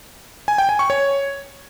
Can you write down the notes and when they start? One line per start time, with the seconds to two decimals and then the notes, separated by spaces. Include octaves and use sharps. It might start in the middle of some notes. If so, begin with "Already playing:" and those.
0.48 G#5
0.58 G5
0.69 G#5
0.79 C#6
0.90 C#5